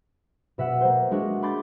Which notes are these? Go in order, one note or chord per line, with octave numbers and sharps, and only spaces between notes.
B2 E5 F#5
A#3 C5
G#3 D4 F#4
G#5 B5 C6 D6 G6 A6